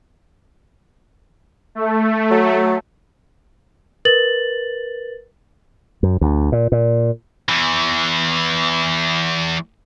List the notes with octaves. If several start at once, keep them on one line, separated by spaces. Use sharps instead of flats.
A3
F#3
A#4 B4 A6 F#7
F#2
D2
A#2
A#2
E2 E3